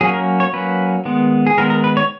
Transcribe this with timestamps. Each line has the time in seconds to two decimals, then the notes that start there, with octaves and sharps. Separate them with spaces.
0.01 F#3 A#3 C#4 G#4
0.13 A#4
0.40 C#5
0.53 F#3 A#3 C#4 B4
1.05 D#3 G#3 B3
1.47 G#4
1.57 D#3 G#3 B3 A#4
1.70 A#4
1.84 B4
1.97 C#5